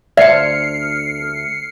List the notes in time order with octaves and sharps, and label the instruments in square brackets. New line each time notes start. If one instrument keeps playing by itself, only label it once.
[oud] D2 C5 [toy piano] D5 [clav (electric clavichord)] E5 [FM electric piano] F6 C7 C#7